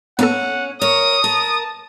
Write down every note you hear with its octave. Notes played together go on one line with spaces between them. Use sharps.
A#3 B3 C#4 A4 F#5
A#4 C#5 D#6
A#4 A5